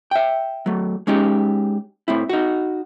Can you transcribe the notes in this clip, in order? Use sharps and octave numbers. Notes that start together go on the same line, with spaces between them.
E5 G5
F#3 A3
G#3 C#4 D#4 G4
A2 C4 E4
D#4 F#4